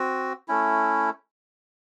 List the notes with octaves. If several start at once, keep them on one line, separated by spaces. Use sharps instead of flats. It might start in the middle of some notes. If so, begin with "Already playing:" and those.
Already playing: C4 F#4
A3 C#4 E4